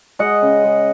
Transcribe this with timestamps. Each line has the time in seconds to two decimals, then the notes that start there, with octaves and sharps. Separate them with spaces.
0.19 G#3 D#5 F#5
0.42 C#3
0.64 G#3